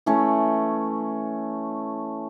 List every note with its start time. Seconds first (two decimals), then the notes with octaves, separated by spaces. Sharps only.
0.06 E3 A3 C#4